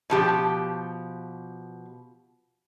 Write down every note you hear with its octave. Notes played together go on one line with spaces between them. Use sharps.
B2 F3 G4